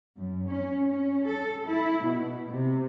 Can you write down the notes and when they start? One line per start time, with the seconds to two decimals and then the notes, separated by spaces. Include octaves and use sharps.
0.17 F#2
0.48 C#4
0.90 C#4
1.26 A4
1.67 E4
2.05 B2
2.51 C3